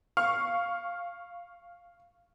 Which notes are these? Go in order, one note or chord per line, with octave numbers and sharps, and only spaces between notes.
F5 C#6 F6